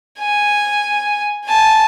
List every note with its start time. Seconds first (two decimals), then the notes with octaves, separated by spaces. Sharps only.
0.19 G#5
1.45 G#5 A5